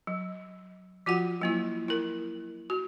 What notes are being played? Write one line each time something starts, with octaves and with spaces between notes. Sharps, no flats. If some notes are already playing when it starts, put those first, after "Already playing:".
F#3
F3 F4 F#4 F#5
F#3 A#3 E4
E4 A#4
F#4